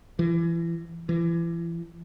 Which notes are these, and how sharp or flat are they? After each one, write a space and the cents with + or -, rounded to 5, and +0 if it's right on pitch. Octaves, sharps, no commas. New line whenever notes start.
E3 +30
E3 +35